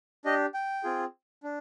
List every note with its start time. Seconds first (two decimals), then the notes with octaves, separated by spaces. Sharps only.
0.25 D4 G4 D#5
0.54 G5
0.84 C4 F4 G#4
1.43 D4